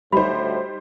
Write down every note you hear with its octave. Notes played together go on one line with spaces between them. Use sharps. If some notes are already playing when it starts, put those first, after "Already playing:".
D2 A2 G3 D#4 C5 B5